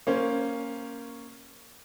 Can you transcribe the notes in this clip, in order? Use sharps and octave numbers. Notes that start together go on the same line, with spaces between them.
A#3 C#4 C5